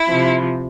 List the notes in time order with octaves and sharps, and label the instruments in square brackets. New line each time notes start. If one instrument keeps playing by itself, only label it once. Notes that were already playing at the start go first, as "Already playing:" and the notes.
Already playing: [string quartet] E4
C3 F3